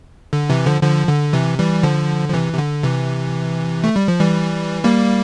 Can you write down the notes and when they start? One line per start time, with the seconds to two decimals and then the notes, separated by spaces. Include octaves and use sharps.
0.33 D3
0.50 C3 E3
0.66 D3 F3
0.83 D3 F3
1.08 D3
1.33 C3 E3
1.59 E3 G3
1.83 D3 F3
2.29 F3
2.33 C3 E3
2.53 C3
2.58 D3
2.83 C3 E3
3.84 A3
3.96 G3
4.08 F3
4.20 E3 G3
4.84 G3 A#3